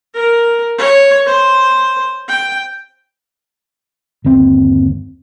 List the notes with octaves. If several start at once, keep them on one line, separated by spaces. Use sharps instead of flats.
A#4
C#5
C5
G5
G1 D#2 C4